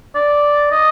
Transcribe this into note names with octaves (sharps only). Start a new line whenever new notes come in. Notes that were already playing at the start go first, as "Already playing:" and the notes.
D5
D#5